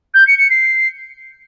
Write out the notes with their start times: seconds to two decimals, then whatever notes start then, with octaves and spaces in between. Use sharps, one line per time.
0.14 G6
0.27 C#7
0.38 C#7
0.50 C7